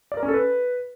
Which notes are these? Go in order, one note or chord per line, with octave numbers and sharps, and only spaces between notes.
D5
A#4
C#4
A4
B4